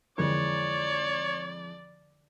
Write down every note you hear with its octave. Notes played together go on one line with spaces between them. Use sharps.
F2 D3 E3 G#3 C#5 D5